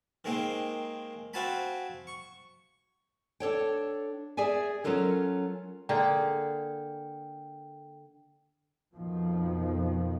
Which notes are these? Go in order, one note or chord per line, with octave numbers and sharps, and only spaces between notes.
D#3 G#3 A#3 C4
C4 F#4 F5 G#5 A5 B5
C#6
D4 A4 C#5 G5
G#4 D5 E5 G#5
F#3 C#4 F4 A4 A#4
D3 A#3 G#4 G5
F2 B2 D#3 F3